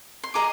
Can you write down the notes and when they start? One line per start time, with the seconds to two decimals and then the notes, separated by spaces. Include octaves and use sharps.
0.24 C6
0.34 G#4 D#5 A#5 D6